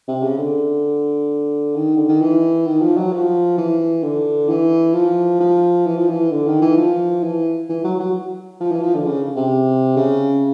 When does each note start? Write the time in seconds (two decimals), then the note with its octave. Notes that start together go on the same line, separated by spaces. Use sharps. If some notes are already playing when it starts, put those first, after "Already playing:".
0.08 C3
0.23 C#3
0.38 D3
1.76 D#3
1.97 D3
2.09 D#3
2.21 E3
2.67 D#3
2.82 F3
2.97 F#3
3.13 F3
3.58 E3
4.03 D3
4.49 E3
4.94 F3
5.40 F3
5.86 E3
5.97 F3
6.09 E3
6.32 D3
6.47 D#3
6.62 E3
6.77 F3
7.23 E3
7.69 E3
7.84 F#3
7.99 F#3
8.60 F3
8.71 E3
8.83 F3
8.95 D3
9.05 C#3
9.36 C3
9.97 C#3